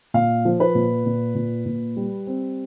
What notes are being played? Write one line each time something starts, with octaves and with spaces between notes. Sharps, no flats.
A#2 F5
F3
B4
A#2
A#2
A#2
A#2
G3
C4